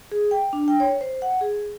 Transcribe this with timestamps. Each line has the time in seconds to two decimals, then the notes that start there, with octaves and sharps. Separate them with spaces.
0.12 G#4
0.31 G5
0.53 D4
0.68 G5
0.80 C#5
1.01 C5
1.22 F#5
1.41 G#4